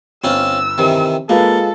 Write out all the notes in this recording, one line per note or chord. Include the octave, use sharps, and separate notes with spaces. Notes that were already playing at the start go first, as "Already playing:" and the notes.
G1 C4 C#4 F4 E6
C3 D#3 E3
G#3 A#3 F4 A4 B4